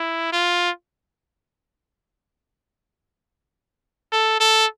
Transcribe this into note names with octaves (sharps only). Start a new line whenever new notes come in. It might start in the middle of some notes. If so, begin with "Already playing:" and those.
Already playing: E4
F4
A4
A4